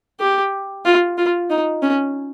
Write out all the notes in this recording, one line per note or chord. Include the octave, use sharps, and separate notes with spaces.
G4
F4
F4
D#4
C#4